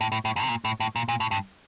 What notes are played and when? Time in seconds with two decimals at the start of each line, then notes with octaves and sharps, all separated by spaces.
0.01 A2
0.12 A2
0.25 A2
0.36 F#2
0.43 C3
0.49 A#2
0.65 A2
0.80 A2
0.96 A#2
1.08 A#2
1.20 A2
1.31 G2